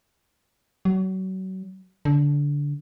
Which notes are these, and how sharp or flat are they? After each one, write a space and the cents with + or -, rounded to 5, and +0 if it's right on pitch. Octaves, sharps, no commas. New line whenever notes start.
F#3 +30
D3 -20